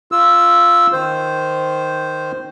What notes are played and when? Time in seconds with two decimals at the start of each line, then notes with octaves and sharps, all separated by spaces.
0.12 F4 E6
0.93 D#3 C5